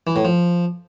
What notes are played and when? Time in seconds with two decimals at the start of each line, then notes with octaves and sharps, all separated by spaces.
0.07 E3
0.16 A2
0.25 F3